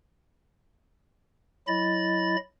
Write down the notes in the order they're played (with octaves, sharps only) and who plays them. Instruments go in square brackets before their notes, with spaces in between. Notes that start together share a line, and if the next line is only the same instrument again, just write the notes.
[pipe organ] F#3 E4 D#5 B5 A6